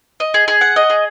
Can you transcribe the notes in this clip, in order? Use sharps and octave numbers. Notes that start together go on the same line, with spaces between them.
D#5
G#4
G#4
F#5
D#5
G#4